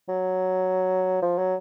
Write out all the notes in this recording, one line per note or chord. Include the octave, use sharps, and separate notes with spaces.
F#3
F3
F#3